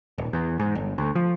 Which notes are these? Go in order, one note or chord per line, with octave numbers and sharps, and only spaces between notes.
D#1
E2
G#2
G1
D2
F3